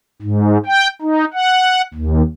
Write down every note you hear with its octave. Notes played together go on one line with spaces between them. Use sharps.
G#2
G5
D#4
F#5
D#2